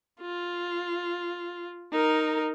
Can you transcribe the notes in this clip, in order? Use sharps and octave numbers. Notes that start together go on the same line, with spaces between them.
F4
D#4 A#4